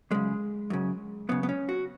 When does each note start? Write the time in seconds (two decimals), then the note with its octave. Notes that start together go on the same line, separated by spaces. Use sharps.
0.11 F#2 C#3 G#3
0.70 F#2 C#3
1.29 F#2 C#3 B3
1.43 B3
1.49 C#4
1.69 F#4